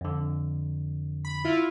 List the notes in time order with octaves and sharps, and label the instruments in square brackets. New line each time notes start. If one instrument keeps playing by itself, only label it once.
[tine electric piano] F2 D3
[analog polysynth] B5
E4 F4